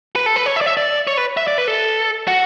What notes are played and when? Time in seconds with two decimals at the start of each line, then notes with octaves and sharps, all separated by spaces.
0.16 B4
0.26 A4
0.36 B4
0.46 C#5
0.56 E5
0.61 D5
0.66 E5
0.77 D5
1.07 C#5
1.17 B4
1.37 E5
1.48 D5
1.58 B4
1.68 A4
2.27 F#4